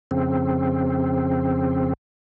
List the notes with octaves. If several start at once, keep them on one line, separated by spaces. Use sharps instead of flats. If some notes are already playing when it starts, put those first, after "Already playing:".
F2 C#3 C4